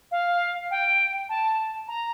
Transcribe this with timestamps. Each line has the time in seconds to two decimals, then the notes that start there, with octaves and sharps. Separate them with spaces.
0.11 F5
0.70 G5
1.29 A5
1.88 A#5